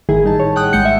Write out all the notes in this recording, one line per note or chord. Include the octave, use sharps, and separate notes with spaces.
G#1 A2 D#3 E4 G#4
G3 D#4 A5
C#5
F#5 G5 D#6 F#6
A#1 G#3 F#5 G6 C#7
E5